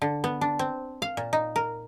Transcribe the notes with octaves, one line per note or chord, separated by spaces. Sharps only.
D3
B3
D4
C4
F5
A#2
D#4
A#4